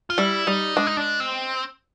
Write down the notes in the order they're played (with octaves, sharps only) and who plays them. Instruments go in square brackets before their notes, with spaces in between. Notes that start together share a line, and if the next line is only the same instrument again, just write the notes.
[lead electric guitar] F4
[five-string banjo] G3 [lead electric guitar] E4
[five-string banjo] G3 [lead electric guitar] D#4
[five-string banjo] G#3 [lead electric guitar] D4
[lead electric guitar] D#4
D4
C4